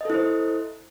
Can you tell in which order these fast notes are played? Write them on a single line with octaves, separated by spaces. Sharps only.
D#5 A4 E4 C5